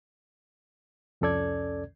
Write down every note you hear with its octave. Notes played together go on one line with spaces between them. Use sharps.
C2 F2 C#4 A4 D5 G#6